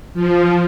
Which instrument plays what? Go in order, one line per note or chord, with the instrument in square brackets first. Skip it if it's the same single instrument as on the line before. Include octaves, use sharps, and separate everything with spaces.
[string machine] F3